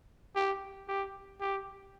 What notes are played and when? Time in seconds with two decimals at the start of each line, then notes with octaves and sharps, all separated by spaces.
0.36 G4
0.88 G4
1.41 G4